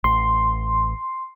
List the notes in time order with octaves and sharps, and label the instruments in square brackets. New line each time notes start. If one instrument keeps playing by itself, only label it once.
[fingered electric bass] A1 [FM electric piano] C6